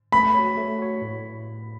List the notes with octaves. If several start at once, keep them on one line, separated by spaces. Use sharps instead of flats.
A3 B5
F#4 C#5
A3
F#4 C#5
A2